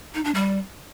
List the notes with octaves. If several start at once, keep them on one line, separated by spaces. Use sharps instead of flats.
D#4
D4
G3